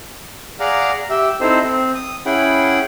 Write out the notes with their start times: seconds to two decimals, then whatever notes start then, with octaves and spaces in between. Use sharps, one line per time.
0.60 G#4 D5 F5 F#5 A#5
1.10 G4 E5
1.41 C4 D#4 E4 A4 C5
1.65 C4
1.95 D#6
2.26 C#4 E4 G#4 F#5 G5 B5